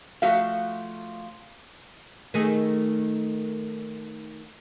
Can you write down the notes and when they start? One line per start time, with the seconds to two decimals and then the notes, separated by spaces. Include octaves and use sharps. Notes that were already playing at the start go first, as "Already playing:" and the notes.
0.22 F3 A3 F#4 E5 F5
2.34 D#3 A3 G#4